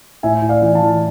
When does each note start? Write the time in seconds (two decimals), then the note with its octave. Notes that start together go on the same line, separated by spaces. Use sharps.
0.23 A2 E5 G#5
0.42 A2
0.49 D5 F5
0.62 E3
0.74 F5 A5
0.81 E3